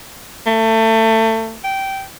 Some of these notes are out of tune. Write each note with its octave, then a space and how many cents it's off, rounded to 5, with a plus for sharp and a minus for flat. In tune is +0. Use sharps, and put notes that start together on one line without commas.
A3 +25
G5 -15